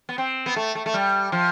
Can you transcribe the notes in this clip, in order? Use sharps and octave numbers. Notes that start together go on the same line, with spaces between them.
B3
C4
B3
A3
A3
A3
G3
F3